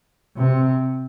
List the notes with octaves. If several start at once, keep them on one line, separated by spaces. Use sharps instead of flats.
C3